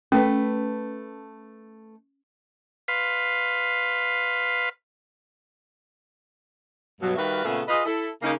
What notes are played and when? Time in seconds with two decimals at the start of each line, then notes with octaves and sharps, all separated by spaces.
0.12 A3 C#4 B4
2.88 B4 F5 C6
7.02 G2 B2 F#3
7.16 D#3 G3 F#4 B4 E5 F5
7.45 A#2 C#3 A3 B3 G#4 A4
7.68 F4 G#4 B4 D#5
7.85 E4 A4
8.22 C#3 A#3 D#4